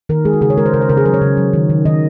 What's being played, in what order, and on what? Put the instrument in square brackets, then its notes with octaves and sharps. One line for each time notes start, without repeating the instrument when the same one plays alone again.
[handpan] D#3 A#4
G#3 G#4
F#4
C#3 G#4
C#5
G#3 A#4
C5
C#3 A#4
C5
C#3 A#4
G#4
F#3 A#4
C#5
C#3
F#3
D#3
D#3
D#3 D#5